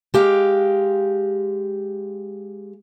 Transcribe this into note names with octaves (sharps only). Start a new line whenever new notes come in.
G#3 G4 F5